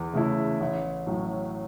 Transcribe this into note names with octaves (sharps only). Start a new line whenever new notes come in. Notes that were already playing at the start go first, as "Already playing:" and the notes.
Already playing: E2
C#3 A3 E4
A1
A2 F#3